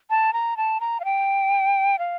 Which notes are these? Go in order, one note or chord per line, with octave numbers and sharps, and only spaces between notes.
A5
A#5
A5
A#5
F5
G5
F5